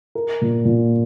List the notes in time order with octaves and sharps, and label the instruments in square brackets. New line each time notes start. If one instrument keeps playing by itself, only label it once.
[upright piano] A#4
A#2
A#2